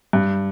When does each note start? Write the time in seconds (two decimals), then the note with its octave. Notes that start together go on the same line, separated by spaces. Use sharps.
0.13 G2